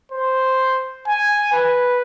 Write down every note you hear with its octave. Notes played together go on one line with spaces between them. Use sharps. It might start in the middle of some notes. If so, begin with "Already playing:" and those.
C5
G#5
B4